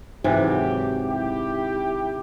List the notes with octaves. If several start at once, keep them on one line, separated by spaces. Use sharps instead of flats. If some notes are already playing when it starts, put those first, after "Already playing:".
G#2 C3 E3 F#3 G4
E4 G4